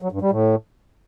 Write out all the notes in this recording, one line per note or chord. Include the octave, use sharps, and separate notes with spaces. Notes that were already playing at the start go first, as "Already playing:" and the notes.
F#3
G2
G3
A2